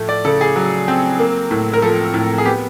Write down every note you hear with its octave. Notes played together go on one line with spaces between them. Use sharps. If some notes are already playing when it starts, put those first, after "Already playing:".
Already playing: A2 F3 A3
D5
C#3 A4
G#4
F#3
C4
A#3
A2
A#4
F3 A4
A2
G#4
B3 G4